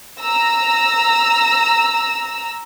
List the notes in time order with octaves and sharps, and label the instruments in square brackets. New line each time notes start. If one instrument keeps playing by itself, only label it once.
[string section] A#5 E6